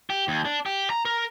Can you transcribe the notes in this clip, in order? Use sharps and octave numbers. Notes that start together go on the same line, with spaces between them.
G4
D#2
D4
G4
A#5
A#4